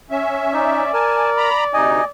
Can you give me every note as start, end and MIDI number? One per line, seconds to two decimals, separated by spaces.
0.10 0.91 61
0.10 0.91 76
0.54 0.84 63
0.54 2.11 74
0.93 1.49 70
0.93 1.30 80
0.93 1.30 81
1.37 1.64 82
1.37 1.64 83
1.74 2.01 38
1.74 2.01 48
1.74 2.01 63
1.74 2.04 75
1.74 2.04 80